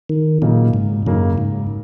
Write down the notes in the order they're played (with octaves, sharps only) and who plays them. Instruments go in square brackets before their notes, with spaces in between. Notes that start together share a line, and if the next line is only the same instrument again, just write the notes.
[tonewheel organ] D#3
[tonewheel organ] A#2 [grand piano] C#3 F#3 A#3 D#4
[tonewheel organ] G#2
[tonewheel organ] F#2 [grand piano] C#3 F#3 A#3 D#4
[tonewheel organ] G#2